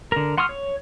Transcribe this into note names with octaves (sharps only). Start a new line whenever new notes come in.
D3 A#4
F#5 C6 C#6 D#6 F6
C#5